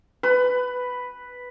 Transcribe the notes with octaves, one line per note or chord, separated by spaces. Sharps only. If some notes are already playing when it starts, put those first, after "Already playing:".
B4